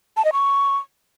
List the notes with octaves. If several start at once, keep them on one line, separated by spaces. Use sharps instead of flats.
A5
D#5
C#6